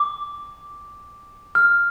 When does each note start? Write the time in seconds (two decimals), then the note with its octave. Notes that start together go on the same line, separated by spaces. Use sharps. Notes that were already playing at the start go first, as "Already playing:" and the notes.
Already playing: D6
1.55 F6